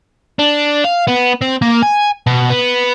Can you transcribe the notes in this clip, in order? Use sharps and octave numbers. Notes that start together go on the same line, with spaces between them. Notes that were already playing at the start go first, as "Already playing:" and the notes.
D4
F5
B3
C4
A#3
G#5
B2
B3